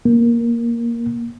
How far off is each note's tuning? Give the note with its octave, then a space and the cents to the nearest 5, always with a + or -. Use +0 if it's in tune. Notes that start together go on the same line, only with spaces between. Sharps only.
A#3 +5